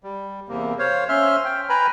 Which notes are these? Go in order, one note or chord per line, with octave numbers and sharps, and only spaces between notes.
G3
E2 C3 A#3
C5 C#5 F5
C#4 E5 C6 F6
G5
B4 G5 G#5 A#5 B5